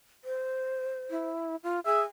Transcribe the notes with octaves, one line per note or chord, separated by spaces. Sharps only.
C5
E4
F4
G#4 E5 G#5